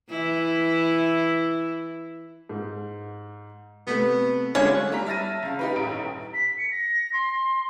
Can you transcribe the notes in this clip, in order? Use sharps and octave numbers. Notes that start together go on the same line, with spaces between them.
E3 E4
G#2
C3 A3 B3 B4
D3 G3 G#3 C#4 F4 C#5
G3 A#5 B6
E5 A5 F6 A6 A#6 D#7
F#1 F5
D#4 G4 B4
D#1 A1 D7
B6
C#7
A#6
C6